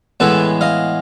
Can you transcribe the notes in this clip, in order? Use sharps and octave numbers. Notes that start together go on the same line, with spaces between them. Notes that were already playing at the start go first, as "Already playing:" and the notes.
A2 E3 G#3 B3 A4 B4
D#5 F5